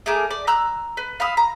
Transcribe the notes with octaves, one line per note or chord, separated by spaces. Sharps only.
A3 G#4 A#4 D6
D5
A#5 E6 F#6
B4
F5 B5 D#6 E6
A#5